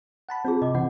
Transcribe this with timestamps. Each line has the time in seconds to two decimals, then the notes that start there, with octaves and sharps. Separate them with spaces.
0.29 F#5 A5 B5
0.45 C4 E4 F4 G#4
0.62 C3 D#5 D6
0.75 C#3 E3 C4 F#5